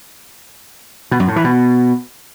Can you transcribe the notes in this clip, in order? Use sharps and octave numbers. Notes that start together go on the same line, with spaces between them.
B2
F#2
A2
E3
B2